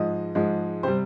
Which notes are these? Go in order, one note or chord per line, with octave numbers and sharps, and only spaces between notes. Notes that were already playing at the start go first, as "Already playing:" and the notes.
Already playing: G#2 F3 G#3 D#5
G#2 F3 G#3
C3 G3 C5